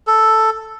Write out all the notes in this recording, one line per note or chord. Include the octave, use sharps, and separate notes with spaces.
A4